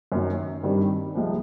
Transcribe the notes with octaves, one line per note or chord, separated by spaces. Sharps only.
F#2 D#3 F#3
G2 D#3 G3 C4
C2 C3 F3 G#3